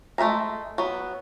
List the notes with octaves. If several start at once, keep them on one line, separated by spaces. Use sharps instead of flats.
G#3 A3 A#4 E5 A#5
F#3 B3